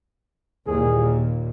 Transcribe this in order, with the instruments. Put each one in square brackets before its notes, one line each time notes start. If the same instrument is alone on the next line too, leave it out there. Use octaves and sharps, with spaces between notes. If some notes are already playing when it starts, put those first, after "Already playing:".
[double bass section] D#2 A#2 [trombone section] E3 G3 G#4